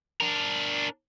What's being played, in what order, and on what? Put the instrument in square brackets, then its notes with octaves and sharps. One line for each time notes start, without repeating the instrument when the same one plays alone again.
[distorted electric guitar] D4 A#4